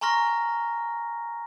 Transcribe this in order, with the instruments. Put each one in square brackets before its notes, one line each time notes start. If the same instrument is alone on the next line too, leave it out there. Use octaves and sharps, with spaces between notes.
[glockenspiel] G#5 A#5 C6 C#6 F6 A#6